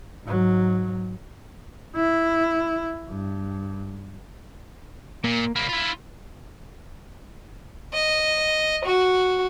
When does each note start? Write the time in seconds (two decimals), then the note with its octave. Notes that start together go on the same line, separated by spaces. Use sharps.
0.24 G#2 F#3
1.96 E4
3.10 G2
5.24 A#2 A#3
5.56 C2 A#3 B5
5.69 E4 F4
7.93 D#5
8.85 F#4